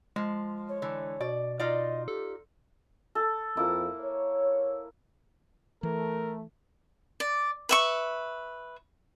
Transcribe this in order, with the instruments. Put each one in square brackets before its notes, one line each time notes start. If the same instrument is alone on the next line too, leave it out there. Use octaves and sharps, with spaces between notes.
[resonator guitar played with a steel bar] F3 [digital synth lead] G#3
[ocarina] C#5
[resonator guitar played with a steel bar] D3 E3
[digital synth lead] B2 [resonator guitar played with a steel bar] D5
[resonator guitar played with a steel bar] D#4 F4 D5 [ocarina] D#5
[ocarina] G4 [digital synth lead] A4
[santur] A4
[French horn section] F2 [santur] A#3 E4
[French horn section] C#5
[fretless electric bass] E3 [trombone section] A3 [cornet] A#4
[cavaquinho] D5
B4 E5 C#6